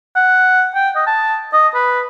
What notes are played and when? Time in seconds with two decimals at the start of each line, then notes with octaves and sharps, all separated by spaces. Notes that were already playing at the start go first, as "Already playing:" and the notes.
0.16 F#5
0.75 G5
0.96 D#5
1.07 A5
1.53 D#5
1.75 B4